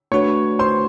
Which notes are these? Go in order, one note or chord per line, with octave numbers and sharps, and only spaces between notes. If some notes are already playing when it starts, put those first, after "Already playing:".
A3 D4 F#4 B4 C#5 C#6
C5 C6